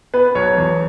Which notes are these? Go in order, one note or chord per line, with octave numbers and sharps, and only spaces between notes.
B3 B4
B1 C#5
E2